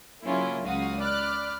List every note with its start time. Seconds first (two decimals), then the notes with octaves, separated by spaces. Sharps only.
0.25 C#3 F#3 A#3 C#4 E4 F4
0.66 C#2 F#4 F5 D#6
0.99 D5 B5 D6 F6 F#6